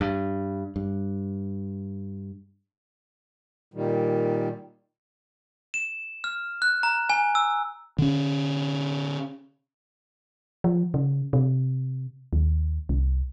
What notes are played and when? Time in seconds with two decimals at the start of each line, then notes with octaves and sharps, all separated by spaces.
0.01 G2
0.76 G2
3.74 A#2 D#3 G3
5.74 E7
6.24 F6
6.62 F#6
6.83 A#5
7.10 G#5
7.35 E6
7.98 D3 C#4
10.64 F3
10.94 C#3
11.33 C3
12.33 D#2
12.89 C2